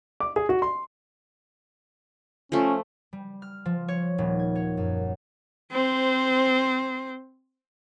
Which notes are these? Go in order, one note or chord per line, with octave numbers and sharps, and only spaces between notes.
D6
G#4
F#4
C6
F3 A3 C#4
G3
F6
F3
C#5
D#1
G#6
C#5
F#2
C4 C5